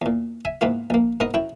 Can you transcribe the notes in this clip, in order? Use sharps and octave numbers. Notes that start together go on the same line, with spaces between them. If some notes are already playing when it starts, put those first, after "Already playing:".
E2 A#2
E5 G#5
G#2 E3 A#3 B3 F4
A#1 A#3
G#2 B3 D#4 A#4 D#5 D#6
F#2 E4 G5